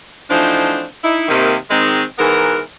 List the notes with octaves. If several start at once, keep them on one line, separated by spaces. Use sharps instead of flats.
E3 F3 A3 C4 D4 D#4
D#4 E4
C3 D#3 A#3
D#3 G#3 C4
G#2 E3 B3 A#4